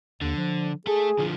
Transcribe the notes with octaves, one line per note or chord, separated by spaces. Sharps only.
D#2 D3
F3
A3 G#4 A4
D3 F3